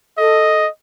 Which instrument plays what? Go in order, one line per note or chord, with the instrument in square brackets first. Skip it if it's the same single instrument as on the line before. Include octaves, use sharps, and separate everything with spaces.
[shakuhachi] A4 [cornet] D#5